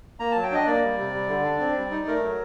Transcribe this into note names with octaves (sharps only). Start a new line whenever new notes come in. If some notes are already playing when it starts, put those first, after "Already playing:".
A#3 A#5
F#3 A5
G5
D4 D#5
A#3 D5
G3
C3
G3
D3
D4
C4
G3
D#4
A3 A#4
F#3